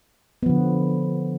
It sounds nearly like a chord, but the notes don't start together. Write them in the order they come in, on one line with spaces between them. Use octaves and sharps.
B3 F3 D3